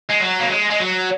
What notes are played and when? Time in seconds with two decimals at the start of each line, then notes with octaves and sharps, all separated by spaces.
0.09 G#3
0.20 F#3
0.40 A#3
0.49 G#3
0.70 G#3
0.79 F#3